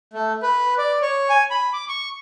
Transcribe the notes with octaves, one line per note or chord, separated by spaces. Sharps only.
A3
B4
D5
C#5
G#5
B5
D6
C#6